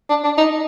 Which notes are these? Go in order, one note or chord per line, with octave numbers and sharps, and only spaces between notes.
D4
D4
D#4